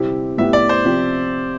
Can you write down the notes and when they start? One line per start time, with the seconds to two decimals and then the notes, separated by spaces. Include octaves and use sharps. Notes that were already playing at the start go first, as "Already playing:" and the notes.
Already playing: C3 G3 C4 E4 G4
0.38 A2 G3 B3 E4 G4 E5
0.53 D5
0.69 C5
0.85 C3 F3 C4 G4